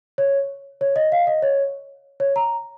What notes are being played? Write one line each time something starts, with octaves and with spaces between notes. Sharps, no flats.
C#5
C#5
D#5
F5
D#5
C#5
C#5
A#5